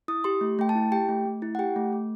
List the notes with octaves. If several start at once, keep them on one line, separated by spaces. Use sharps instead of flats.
E4 D#6
G4 C6
A3
A3 G5
A5
E4
G4 G5
A3
A3
E4
F#5
G4 G5
A3
A3